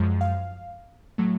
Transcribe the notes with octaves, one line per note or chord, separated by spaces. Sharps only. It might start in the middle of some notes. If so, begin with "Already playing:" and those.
Already playing: F#2 F3 G#3
F5
A2 F#3 A3